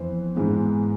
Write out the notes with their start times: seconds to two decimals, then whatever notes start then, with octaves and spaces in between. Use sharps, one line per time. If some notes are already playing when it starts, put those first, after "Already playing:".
Already playing: F2 E3 B3 C5
0.35 G#2 E3 G#3 B3